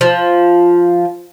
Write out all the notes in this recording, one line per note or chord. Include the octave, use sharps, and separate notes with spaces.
F3